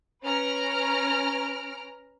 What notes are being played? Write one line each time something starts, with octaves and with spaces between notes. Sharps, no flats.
C#4 B4 A#5 F6 D7